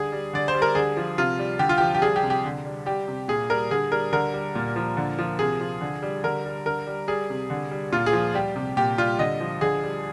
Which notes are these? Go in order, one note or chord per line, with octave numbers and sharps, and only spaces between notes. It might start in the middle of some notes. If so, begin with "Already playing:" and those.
Already playing: D3 G3 G#4
G3
D3 D5
C5
G3
A#4
D3 G#4
F3
C3 F4
G3
D3 G4
F4
F3 G4
G4
G3 G#4
G4
C3
G4
D3
G3
G3 G4
C3
A#2 G#4
G3 A#4
D3 G#4
G3 A#4
D3 A#4
G3
A#2
F3
D3
F3
C3 G#4
F3
D3
G3
D3 A#4
G3
D3 A#4
G3
G3 G#4
C3
D3
G3
A#2 F4
G#4
F3
G3 G4
C3
A#2 G4
G3 F4
D3 D#5
F3
D3 G#4
G3